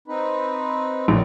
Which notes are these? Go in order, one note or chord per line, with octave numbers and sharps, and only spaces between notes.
C4 D#4 B4
A#1 D#3 F#3 C4